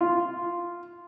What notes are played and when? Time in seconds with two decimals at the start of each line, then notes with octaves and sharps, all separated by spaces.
0.01 F4